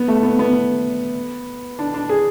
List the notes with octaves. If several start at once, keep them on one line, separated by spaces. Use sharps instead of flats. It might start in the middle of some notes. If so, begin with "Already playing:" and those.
Already playing: B3
A3
B3
B3
D4
D4
G#4